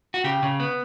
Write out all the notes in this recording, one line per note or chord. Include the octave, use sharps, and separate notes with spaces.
F#4
C#3 G4
C#3
B3